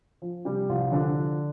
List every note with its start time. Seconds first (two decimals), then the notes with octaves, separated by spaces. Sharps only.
0.22 F3
0.45 C3 G3 G4
0.69 C2 F3 F4
0.92 D3 F3 D4
1.15 F3